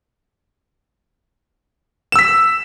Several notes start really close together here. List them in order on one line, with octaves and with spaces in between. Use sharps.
E7 E6 B6